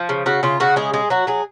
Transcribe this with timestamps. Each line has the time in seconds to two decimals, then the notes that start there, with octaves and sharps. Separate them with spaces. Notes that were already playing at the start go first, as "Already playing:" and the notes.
Already playing: F3
0.09 C#3
0.26 C#3 F#4
0.43 C#3 F4
0.60 C#3 F#4
0.76 G#3 G#4
0.93 G#3 G#4
1.10 F#3 F#4
1.27 F#3 G#4